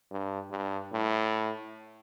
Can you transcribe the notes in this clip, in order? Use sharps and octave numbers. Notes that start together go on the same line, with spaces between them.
G2
G2
A2